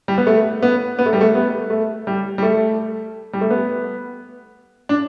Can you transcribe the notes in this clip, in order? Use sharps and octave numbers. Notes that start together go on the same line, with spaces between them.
G3
B3
A3
B3
B3
A3
G3
A3
B3
A3
G3
G3
A3
G3
A3
B3
D4